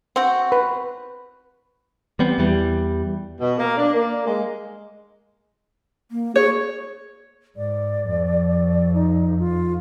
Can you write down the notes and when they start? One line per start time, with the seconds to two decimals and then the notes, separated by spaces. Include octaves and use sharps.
0.16 C4 F#4
0.52 B4
2.19 E3 G3 B3 C4
2.38 E2 E3 G3
3.40 B2
3.59 A#3
3.77 D4
3.94 A#3
4.26 G#3
6.11 A#3
6.36 G#4 C#5
7.57 G#2 D5
8.08 F2
8.94 D#4
9.39 F4